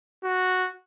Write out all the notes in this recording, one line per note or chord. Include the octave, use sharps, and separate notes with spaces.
F#4